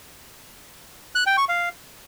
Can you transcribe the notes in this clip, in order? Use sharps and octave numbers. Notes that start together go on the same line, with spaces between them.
F#6
G5
C#6
F5